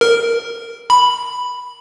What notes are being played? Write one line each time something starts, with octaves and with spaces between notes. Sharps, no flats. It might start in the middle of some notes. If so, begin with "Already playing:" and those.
A#4
B5